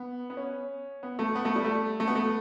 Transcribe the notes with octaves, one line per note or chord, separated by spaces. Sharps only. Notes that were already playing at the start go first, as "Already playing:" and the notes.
Already playing: B3
B3
C#4
B3
A3
B3
A3
G3
A3
A3
B3
A3